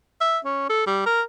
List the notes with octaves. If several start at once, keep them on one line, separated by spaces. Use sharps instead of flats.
E5
C#4
A4
G3
A#4